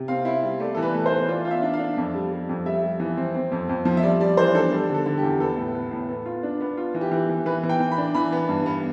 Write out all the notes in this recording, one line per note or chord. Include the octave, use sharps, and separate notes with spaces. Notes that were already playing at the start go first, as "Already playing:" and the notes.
Already playing: C3
C4 F5
E4
G3
A3 D5
E3 A4
B4
A3
C5
E3
F4 D5
F4 F5
E5
D4
F5
D4
F2
G3
G3
F2
G3 E5
G3
E3
C4
C4
F2
F2
F3
E5
G3 D5
G3 D5
E3 C5
D4 A4
G3
D3 A4
D3
G4
E2
B3 A4
A2
B3
A2
B3
F4
D4
B3
F4
E3
G4
E3
E3
E3 B4
E3
G5
E3
B5
D4
E3 B5
B3
G2
B3